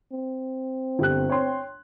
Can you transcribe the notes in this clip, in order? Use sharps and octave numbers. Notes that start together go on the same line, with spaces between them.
C4
G1 G4 F#6
C#5 G5 C6